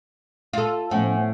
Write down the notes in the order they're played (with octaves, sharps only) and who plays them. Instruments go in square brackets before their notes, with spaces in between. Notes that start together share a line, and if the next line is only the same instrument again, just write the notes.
[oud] F4 A4
[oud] A2 [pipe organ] F3 B3 C#4